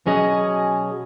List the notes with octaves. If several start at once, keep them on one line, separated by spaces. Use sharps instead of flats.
B2 F#3 C#4 G#4 D#5